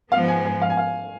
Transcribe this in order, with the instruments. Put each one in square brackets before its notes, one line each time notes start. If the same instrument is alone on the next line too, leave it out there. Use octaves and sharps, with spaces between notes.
[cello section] G#2 F3 B3 [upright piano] F5
[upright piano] G#5
G#5
F5
G#5
F5